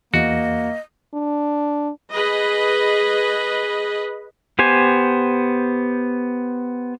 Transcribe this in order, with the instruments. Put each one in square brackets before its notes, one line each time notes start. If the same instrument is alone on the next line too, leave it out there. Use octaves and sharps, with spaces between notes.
[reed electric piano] E2 [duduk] A#3 [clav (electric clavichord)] F#4 [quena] D#5
[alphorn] D4
[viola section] G#4 B4 D#5
[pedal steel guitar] B3 G4 C5 G#5